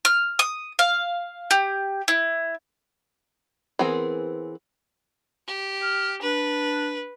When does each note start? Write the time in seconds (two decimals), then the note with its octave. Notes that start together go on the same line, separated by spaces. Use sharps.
0.05 F6
0.39 D#6
0.79 F5
1.51 G4
2.08 E4
3.79 E3 B3 C4 G#4 A#4
5.47 G4
5.82 F6
6.22 D4 B4